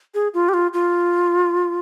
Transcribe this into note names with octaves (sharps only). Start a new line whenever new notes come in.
G#4
F4
G4
F4
F4